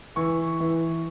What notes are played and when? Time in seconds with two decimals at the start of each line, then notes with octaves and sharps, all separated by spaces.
0.16 E3 C#6
0.60 E3